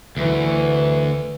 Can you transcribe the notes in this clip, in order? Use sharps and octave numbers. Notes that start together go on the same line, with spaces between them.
D2 E3